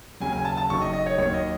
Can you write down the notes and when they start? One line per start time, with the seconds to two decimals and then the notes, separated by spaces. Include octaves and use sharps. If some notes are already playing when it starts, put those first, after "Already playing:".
0.20 D#2 C#3 F#3 G#5
0.33 G#5
0.45 A5
0.57 A5
0.70 F#1 F#2 D#3 C#6
0.82 D#5
0.93 D#5
1.06 C#5
1.18 D#2 D#3 F#3 C#5
1.34 D#5